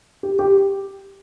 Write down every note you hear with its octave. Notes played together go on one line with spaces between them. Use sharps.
G4
G4